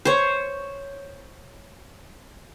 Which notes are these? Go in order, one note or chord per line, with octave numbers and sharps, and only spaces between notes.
C5 C#5